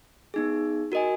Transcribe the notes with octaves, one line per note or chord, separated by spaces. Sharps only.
B3 D#4 G#4
F#4 A#4 D#5 G#5